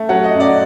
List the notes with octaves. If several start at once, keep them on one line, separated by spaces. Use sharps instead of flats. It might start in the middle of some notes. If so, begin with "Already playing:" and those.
Already playing: A3
F#3 F#5
D#5
F#2
D5